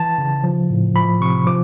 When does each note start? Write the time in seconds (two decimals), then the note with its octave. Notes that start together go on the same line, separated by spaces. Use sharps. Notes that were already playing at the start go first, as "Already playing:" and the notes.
Already playing: E3 A5
0.18 C#3
0.44 F3
0.70 A2
0.95 F3 B5
1.21 C3 C#6
1.47 F3 D6